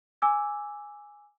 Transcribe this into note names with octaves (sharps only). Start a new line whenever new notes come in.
G#5 D6 E6 G#6